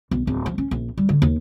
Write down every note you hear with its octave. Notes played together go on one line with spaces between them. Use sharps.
B1
D1
F3
C#4
A#1
G3
D3
D#2